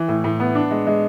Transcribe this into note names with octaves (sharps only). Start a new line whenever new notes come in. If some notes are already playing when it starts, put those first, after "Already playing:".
Already playing: E3
A2
A2
B3
D4
G#3
G#3